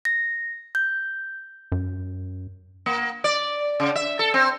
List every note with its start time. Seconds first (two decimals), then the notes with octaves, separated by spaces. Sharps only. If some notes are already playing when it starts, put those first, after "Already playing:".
0.05 A#6
0.75 G6
1.72 F#2
2.86 A#3
3.24 D5
3.80 C#3
3.96 E5
4.19 A4
4.34 C4